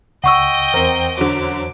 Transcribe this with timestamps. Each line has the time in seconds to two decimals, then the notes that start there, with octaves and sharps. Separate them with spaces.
0.24 C#2 D#5 F#5 G5 C#6 E6
0.74 E2 C4 A#4 C5
1.17 F#2 D3 D6